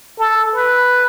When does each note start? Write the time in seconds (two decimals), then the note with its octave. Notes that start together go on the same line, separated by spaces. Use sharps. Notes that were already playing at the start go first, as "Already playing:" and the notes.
0.19 A4
0.55 B4